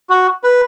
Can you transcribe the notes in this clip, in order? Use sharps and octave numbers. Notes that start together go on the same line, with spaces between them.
F#4
B4